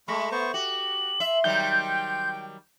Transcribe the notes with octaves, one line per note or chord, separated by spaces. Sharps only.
G#3 A3 B5 C#6
B3 C5 C#6
F#4 G4 F#7
E5 C6
D#3 F#3 G3 G5 G6